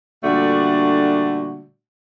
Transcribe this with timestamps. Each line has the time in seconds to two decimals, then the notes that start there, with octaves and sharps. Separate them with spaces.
0.23 A#2 D3 G3 A3 D4 F#4